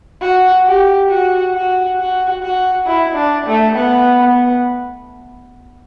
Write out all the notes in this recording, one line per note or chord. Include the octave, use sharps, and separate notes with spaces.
F#4
G4
F#4
F#4
F#4
F#4
E4
D4
A3
B3
B3